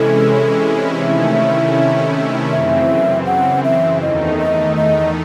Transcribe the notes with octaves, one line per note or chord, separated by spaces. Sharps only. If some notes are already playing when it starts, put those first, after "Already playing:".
Already playing: C3 E3 G#3 C#4 E4 A4
C3 D#3 A3 C#4 E4 E5
F#2 C#3 E3 C4 E5
F#5
E5
E2 D#3 A3 D#4 D#5
D#5
D#5